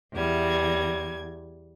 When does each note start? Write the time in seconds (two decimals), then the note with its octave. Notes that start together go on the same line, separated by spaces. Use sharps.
0.14 E2 G3 G#6